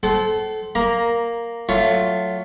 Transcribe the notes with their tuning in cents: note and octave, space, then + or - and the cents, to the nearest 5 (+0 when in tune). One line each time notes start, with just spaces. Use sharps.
A4 -20 C5 +0 F#5 +40
A#3 +0 A#5 +10
F#3 +0 A3 +15 F4 +0